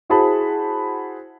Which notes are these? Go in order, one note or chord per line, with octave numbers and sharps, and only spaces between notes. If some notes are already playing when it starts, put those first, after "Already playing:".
E4 F#4 G#4 C5 A5 B5